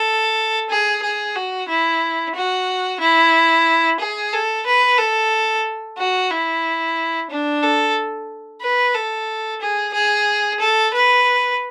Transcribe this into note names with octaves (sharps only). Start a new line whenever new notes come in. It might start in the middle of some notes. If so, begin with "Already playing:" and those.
Already playing: A4
G#4
G#4
F#4
E4
F#4
E4
G#4
A4
B4
A4
F#4
E4
D4
A4
B4
A4
G#4
G#4
A4
B4